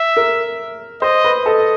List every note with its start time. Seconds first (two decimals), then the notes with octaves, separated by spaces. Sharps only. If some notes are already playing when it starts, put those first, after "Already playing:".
Already playing: E5
0.17 A#4
1.02 C5 D#5
1.25 B4
1.45 A4 D#5